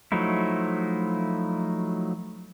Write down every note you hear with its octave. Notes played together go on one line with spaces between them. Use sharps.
F3 F#3 A3 D#4 E4